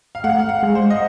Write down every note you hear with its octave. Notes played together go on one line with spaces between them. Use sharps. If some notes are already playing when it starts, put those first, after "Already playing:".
F5
A3 F#5
F5
F#5
G#3
C5
D#5